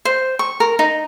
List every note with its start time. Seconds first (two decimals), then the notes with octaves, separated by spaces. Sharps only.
0.05 C5
0.39 C#6
0.60 A#4
0.79 D#4